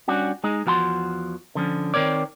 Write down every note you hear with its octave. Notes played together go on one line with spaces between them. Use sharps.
G3 C#4 D4 F#4
G#3 D#4 G#4
E2 F3 F#4 A#5 C6
D3 F3 C#4
D#3 C4 A#4 C#5 D5